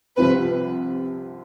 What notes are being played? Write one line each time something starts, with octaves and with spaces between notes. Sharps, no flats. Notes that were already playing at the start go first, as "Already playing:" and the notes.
C2 C3 F3 C4 B4